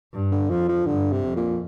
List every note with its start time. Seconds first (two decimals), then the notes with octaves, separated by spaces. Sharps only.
0.14 G2
0.31 D3
0.50 F2 F3
0.69 F3
0.87 G2 D3
1.12 C3
1.24 F2
1.36 A#2